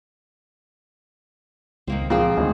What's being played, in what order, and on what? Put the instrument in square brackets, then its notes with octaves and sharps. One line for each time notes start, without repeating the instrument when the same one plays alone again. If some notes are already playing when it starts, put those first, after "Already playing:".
[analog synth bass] C#2 [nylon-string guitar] D#3 A#3 C4
[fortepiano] A#2 F3 [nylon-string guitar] C4 G#4 G5
[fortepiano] G#1 [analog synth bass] D2